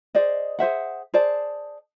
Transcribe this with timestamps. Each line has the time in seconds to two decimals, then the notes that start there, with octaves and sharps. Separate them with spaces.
0.15 G#4 C5 D5 D#5
0.59 G#4 C5 E5 F#5
1.14 G#4 C5 D5 A5